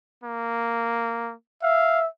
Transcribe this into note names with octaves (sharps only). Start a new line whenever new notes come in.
A#3
E5 F5